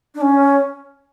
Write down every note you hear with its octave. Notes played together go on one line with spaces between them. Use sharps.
D4
C#4